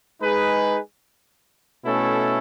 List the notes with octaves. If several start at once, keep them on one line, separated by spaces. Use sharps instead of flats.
G#3 D#4 G#4 B4
B2 A3 C#4 E4 A4